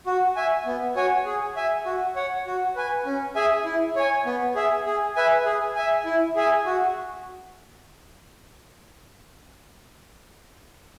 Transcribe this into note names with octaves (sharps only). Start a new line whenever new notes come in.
F#4
E5 G#5
B3
F#4 C#5 G#5
G#4
E5 G#5
F#4
C#5 F#5
F#4
B4 G#5
C#4
G#4 E5 G#5
E4
C#5 G#5
B3
G#4 E5
G#4
B4 E5 G#5
G#4
E5 G#5
E4
G#4 E5 G#5
F#4